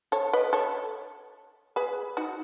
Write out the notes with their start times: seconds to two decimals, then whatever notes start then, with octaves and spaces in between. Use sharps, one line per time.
0.12 A4 C#5
0.33 B4 D#5
0.53 A4 C#5
1.76 G#4 B4
2.17 D#4 F#4